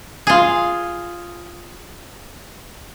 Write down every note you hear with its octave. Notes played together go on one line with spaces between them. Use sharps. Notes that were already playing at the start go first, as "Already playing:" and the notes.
F4 G#4